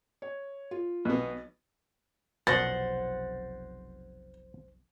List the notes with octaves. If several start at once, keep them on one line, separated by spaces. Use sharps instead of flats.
C#5
F4
B1 B2 B3
F1 B1 B2 C5 F#5 A6 A#6